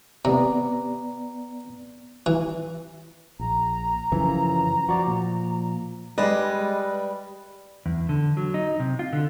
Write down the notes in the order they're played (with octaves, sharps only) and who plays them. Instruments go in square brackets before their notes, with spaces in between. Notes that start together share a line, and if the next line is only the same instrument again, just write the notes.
[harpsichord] C3 [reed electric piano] B3 D5 A#5
[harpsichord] E3
[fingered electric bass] A#1 [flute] A#5
[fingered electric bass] F#2 C#3 F3 [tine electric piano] E3
[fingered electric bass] F3 [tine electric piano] F#4 D5
[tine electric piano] A#2
[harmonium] G3 [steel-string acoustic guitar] G#3 D#5 [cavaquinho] B4 [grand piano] D5
[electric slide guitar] E2
D3
F#3
D#4
C3
F4
D3